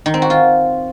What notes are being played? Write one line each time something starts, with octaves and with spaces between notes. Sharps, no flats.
D#3
C4
F#4
F4